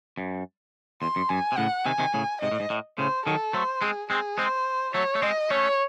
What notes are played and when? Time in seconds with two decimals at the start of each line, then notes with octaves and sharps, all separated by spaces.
0.18 F#2
1.01 E2 C6
1.16 F#2
1.29 F#2 G#5
1.52 C3
1.57 A2 C#3 F#5
1.86 C3 D#3 G#5
1.99 C3 D#3
2.14 A2 C#3
2.41 G#2 C3 D#5
2.52 A2
2.60 G#2
2.70 A2
2.98 A2 C#3 C5
3.26 D#3 F#3 A4
3.53 F#3 A3 C5
3.81 G#3 C4 G#4
4.10 G#3 C4 G#4
4.38 G#3 C4 C5
4.94 F#3 A3 C#5
5.15 A3
5.22 G#3 C4 D#5
5.50 A3 C#4 C#5